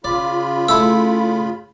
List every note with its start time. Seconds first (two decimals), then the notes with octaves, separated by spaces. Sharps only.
0.04 C#3 F4 D5 B5
0.68 A3 E4 E6